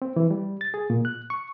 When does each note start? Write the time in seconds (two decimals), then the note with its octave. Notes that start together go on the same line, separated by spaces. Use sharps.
0.02 C4
0.16 E3
0.31 G3
0.61 A6
0.74 G#4
0.90 A#2
1.05 F#6
1.30 C#6